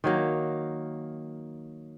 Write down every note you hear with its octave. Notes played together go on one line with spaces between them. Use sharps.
D#3 F#3 A#3